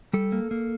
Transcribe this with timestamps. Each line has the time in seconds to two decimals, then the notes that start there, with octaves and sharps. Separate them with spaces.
0.13 G3 A4
0.32 A#3
0.51 A#3